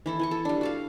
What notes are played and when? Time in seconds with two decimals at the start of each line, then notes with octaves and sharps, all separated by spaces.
0.06 E3 E4 A4
0.19 E3 G#5 C#6
0.31 A4
0.45 G3 D4
0.61 F#4 A4 F5